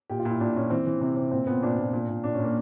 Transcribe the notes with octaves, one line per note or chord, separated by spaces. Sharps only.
A#2 G4
F4
A#2
E4
A#2 D4
A#2 C#4
E3 C4
E3
C3
C3
A#2 C4
A#2 B3
A#2 D4
A#2
A#2
A#2
A#2 D4
A#2 C#4
A#3